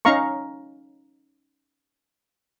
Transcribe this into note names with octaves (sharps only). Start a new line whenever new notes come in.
C#4 D#4 F5 A#5 C#6